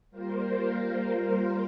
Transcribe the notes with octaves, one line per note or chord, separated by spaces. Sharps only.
G3 A#3 F4 A#4 C5